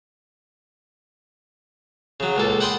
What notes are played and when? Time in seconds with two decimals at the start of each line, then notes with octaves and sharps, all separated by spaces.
2.20 C#3 F#3
2.37 C#2 A#2 A4
2.60 F#5 G5 B5 C6 D#6